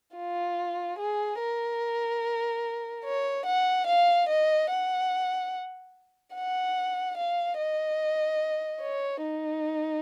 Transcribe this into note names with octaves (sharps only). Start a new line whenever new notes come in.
F4
G#4
A#4
C#5
F#5
F5
D#5
F#5
F#5
F5
D#5
C#5
D#4